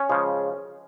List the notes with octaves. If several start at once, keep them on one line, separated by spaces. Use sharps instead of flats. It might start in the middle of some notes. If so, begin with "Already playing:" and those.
Already playing: C#4
C#3 F3 G#3